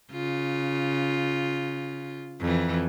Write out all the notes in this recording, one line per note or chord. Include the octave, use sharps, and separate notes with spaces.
C#3 F4
F2 E3